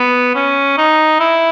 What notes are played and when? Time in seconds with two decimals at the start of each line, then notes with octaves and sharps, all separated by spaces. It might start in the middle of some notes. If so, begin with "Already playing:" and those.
Already playing: B3
0.35 C#4
0.78 D#4
1.20 E4